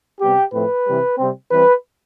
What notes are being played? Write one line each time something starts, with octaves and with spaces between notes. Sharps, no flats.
C3 G3 B3 G4
A2 F3 A3 C4 B4
C3 E3 G3
C3 G3 C4
E3 G3 C4 B4